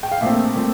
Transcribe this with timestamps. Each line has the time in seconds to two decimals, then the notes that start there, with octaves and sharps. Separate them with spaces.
0.03 G5
0.12 F5
0.21 A#1 A#2 A3 C4 E5
0.55 A#2 A3 C4